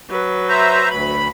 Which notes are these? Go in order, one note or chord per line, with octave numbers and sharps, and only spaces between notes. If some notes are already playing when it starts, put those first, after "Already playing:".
F#3 B4
C5 E5 A#5
D2 B5